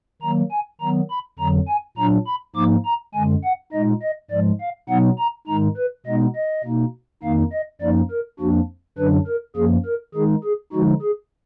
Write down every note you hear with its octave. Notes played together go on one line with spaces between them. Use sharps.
D#3 F#3 A#3 A#5
G#5
D#3 F#3 B3 A#5
B5
F2 D3 F#3 A#5
G#5
A#2 F#3 D4 A#5
B5
G#2 F3 A#3 D#4 D6
A#5
F#2 D3 G#3 G#5
F#5
A#2 G#3 D#4 D#5
D#5
G#2 F3 G#3 D5
F5
B2 F#3 B3 D#4 F#5
A#5
G#2 D#3 G#3 D#4 A#5
B4
B2 G#3 B3 D#4 D#5
D#5
B2 A#3 D#4
F2 D#3 A#3 D#4 F5
D#5
F#2 F3 A#3 D#4 D5
A#4
F2 F3 A#3 D4 F#4
F#2 D3 F#3 D4 B4
A#4
F#2 F3 A#3 G#4
A#4
D#3 G#3 D#4 G#4
G#4
D3 F3 G#3 D#4 F#4
G#4